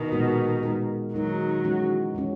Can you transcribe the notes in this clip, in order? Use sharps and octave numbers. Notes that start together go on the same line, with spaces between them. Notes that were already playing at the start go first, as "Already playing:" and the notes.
Already playing: B2 D#3
A#2 G#3 B3 F#4
G#3 D#4 A#4
D#3 F#3 G#3 D#4 A#4
E3 G#3 C#4 F#4
E3 G#3 C#4 F#4